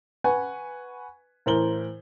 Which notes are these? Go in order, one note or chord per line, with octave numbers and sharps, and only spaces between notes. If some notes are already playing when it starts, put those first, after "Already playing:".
B4 F#5 G#5 C#6
A2 E3 A#4 C5 F#7 G7